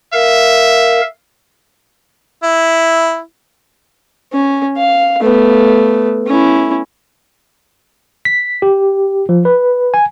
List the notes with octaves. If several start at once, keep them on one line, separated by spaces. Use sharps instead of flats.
A#4 E5 F5
E4
C#4
F5
A3 B3
C#4 E4
B6
G4
F3
B4
G#5